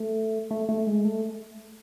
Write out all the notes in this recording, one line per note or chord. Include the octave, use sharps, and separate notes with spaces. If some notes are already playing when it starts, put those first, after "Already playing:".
Already playing: A3
A3
A3
G#3
A3